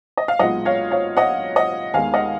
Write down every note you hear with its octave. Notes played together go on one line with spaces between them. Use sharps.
D#5
F5
B1 A#2 G#3 B3 D#5 F#5
C#5 F5
C#5 F5
D#5 F#5
D#5 F#5
D#2 D#3 G#3 B3 F5 G#5
D#5 F#5